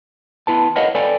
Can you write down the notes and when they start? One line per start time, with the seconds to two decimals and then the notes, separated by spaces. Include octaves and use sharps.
0.47 B3 E4 B4 A5
0.76 A#4 B4 C#5 D#5 F5 F#5
0.95 A4 B4 D5 G5 G#5